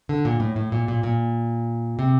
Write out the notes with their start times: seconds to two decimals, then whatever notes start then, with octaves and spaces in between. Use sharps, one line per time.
0.09 D3
0.25 A#2
0.40 A2
0.56 A2
0.72 A#2
0.88 A#2
1.03 A#2
1.99 C3